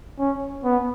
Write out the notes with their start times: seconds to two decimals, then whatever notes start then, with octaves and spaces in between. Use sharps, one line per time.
0.19 C#4
0.64 B3